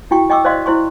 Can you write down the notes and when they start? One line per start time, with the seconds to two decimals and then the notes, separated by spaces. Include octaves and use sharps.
0.11 E4 F#4 G5 C#6
0.30 D#5 G5 C#6 D6 E6
0.45 C5 D5 D#5 F5 C6
0.66 E4 C5 C6 C#6